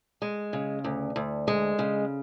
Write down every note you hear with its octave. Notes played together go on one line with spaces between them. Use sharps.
G#3
C#3
D2
D2
G#3
C#3